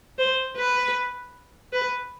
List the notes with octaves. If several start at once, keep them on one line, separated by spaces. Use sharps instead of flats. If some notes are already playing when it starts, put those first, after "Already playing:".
C5
B4
B4